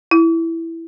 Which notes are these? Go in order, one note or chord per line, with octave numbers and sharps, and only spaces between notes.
E4